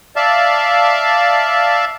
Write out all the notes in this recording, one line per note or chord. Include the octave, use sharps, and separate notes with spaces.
D5 E5 F5 A5